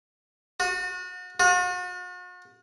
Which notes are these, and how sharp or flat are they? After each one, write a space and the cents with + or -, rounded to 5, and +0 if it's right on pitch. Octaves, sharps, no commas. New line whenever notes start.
F#4 -35
F#4 -45